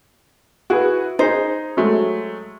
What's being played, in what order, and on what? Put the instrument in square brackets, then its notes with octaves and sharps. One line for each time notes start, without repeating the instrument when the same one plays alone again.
[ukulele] E4 [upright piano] F#4 G#4 B4
[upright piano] D#4 G#4 [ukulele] C5
[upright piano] F#3 G#3 A3